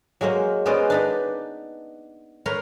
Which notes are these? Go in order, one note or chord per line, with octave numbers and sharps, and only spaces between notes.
F#3 G#3 A#3 C5
G#3 B3 C#4 C5 D5 D#5
D4 D#4 B4
A#4 B4 C#5 A#5 C6